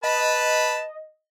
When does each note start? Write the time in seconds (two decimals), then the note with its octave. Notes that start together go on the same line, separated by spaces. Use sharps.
0.04 B4 D#5 A5 B5